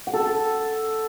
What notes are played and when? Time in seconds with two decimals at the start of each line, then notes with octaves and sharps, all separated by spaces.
0.07 F#5
0.14 A4
0.20 A5
0.27 A4